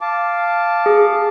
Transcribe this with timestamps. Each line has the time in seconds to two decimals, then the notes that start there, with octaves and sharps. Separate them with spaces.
0.01 F5 A5 D6
0.86 G#4